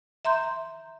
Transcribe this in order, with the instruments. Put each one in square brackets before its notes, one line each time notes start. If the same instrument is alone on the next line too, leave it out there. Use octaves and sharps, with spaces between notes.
[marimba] E5 A#5 C6 G6